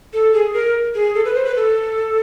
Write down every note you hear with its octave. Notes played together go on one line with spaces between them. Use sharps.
A4
G#4
A#4
G#4
A4
B4
C5
B4
A4